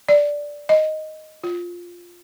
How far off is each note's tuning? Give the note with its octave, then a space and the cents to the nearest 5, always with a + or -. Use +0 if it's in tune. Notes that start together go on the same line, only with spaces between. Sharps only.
D5 -5
D#5 +0
F4 +5